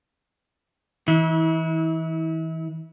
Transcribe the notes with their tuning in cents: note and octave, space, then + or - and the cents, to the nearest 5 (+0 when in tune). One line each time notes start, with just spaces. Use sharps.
E3 -30 E4 -40